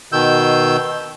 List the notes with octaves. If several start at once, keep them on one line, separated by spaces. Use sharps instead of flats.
B2 D#3 E6 G6